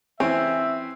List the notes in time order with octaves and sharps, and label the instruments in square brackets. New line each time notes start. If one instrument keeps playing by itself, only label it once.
[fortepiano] E3 C4 [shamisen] C#4 [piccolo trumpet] E5